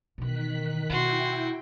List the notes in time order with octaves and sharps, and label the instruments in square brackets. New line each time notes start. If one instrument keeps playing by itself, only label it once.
[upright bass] B2 E3 [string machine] D#3 F#6 B6
[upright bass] B2 [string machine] E4 G5 [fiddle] F#4 C6